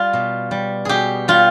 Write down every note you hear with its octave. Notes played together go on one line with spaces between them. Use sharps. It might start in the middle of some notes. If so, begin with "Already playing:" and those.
Already playing: G3 F4
B2
G3
B2 G4 G#4
G3 F4